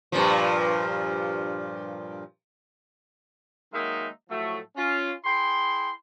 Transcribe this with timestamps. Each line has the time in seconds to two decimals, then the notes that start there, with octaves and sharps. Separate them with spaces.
0.12 G2 A#2 F3
3.73 D#3 F#3 G#3 A#3 D#4 E5
4.29 A2 F3 F#3 A3
4.76 C#4 F4
5.24 E4 G#4 G5 C6